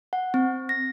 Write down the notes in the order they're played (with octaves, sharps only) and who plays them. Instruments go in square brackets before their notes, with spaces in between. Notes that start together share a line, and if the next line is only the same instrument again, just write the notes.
[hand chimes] F#5
C4
A#6